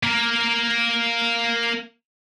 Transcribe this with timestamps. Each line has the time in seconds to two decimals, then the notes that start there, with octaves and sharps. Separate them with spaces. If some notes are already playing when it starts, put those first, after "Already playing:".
0.03 A#3 A#4